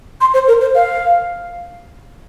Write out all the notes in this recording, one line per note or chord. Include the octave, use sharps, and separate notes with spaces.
C6
C5
A#4
C5
F5